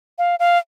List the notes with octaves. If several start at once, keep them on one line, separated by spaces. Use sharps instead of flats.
F5
F5